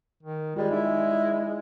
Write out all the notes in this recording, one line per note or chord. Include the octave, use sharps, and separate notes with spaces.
D#3
G3 G#3 F4 G#4 D5
D#4 E4